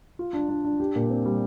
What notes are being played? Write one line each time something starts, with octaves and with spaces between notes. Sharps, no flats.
F4
D4
D4
D4
G4
A#2
C4
G3